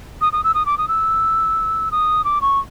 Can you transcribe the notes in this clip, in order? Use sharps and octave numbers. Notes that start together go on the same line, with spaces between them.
D#6
D#6
E6
D#6
D6
D#6
E6
D#6
D6
C#6